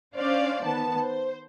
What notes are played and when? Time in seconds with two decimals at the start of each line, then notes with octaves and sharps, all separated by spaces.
0.15 C#4 D4 C5 D5 F5
0.63 D#3 B3 A5
1.00 C5